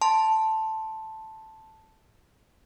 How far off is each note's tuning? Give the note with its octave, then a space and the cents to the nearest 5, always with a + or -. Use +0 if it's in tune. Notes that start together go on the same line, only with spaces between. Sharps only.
A5 +0 C6 +5